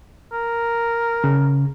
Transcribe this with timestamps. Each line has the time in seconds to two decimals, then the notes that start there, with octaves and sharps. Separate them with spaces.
0.32 A#4
1.24 C#3